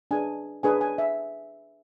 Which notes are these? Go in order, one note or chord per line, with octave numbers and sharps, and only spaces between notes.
D4 G#4 B4 G#5
D4 G#4 B4 G#5
G#5
E5